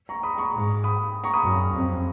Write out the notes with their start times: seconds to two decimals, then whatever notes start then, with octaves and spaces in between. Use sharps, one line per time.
0.09 A#5 C#6
0.23 B5 D#6
0.38 A#5 C#6
0.54 G#2
0.84 B5 D#6
1.24 A#5 C#6
1.34 B5 D#6
1.44 F#2
1.73 F2